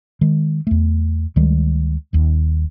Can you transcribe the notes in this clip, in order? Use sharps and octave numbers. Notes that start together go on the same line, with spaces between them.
D#3 G#3
E2 A3
D2 D#3 G3 G#3
D#1 D#2